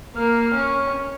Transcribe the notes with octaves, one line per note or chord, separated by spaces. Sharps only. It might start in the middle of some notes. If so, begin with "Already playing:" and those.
A#3 F6
C#4